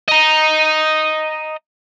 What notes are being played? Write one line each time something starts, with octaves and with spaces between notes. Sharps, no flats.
D#5 A#5